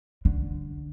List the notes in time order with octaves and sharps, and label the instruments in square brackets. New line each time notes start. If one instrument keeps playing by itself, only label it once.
[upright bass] D3